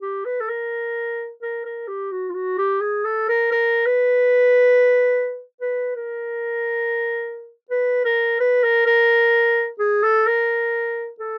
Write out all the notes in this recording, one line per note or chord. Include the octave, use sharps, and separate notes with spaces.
G4
B4
A4
A#4
A#4
A#4
G4
F#4
F4
F#4
G4
G#4
A4
A#4
A#4
B4
B4
A#4
B4
A#4
B4
A#4
A#4
G#4
A4
A#4
A4